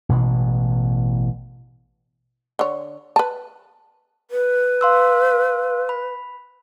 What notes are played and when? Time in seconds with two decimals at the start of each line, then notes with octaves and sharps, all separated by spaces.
0.09 A1 B2 E3 G#3
2.59 D3 C#5
3.16 B4 A5
4.31 B4
4.81 F5 C6 E6
5.89 B5